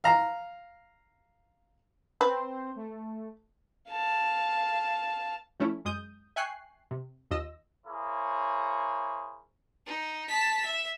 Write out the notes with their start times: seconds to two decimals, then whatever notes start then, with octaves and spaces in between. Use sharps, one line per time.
0.04 F5 A#5
2.21 C4 B4 C5
2.76 A3
3.89 F5 A5
5.60 F3 A3 C#4 E4
5.85 F#2 G#3 D#6 G6
6.36 E5 G5 G#5 C#6 F#6 C7
6.91 C3
7.31 D#2 F4 D#5 E6 A#6
7.86 A#3 E4 G#4 C5 C#5
9.86 D#4
10.28 A5 B6
10.64 E5